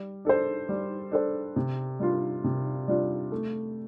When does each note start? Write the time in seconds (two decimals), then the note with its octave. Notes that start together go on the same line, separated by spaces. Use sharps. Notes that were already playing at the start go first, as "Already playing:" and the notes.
Already playing: G3
0.25 D4 A4 C5
0.69 G3
1.12 D4 A4 C5
1.56 C3
2.00 G3 D4 F4
2.44 C3
2.88 G3 D4 F4
3.32 A3